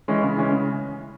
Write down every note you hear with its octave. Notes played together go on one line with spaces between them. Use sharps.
E3 G#3 C#4
C#3
E3 G#3 C#4
C#3